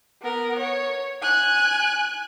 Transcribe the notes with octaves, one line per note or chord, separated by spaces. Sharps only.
B3 A#4
C#5
G#5 F#6